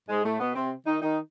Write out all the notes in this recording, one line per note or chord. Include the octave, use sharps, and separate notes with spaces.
G#2 G#3
A2 A3
B2 B3
C3 C4
D#3 D#4
D#3 D#4